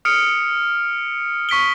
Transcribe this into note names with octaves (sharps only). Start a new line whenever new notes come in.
D#6 F6 C#7 D7
C#6 B6 D7 G7